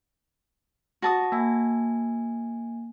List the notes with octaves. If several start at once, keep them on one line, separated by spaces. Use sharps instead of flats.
F#4 A5 D#6 A#6
A#3 G#5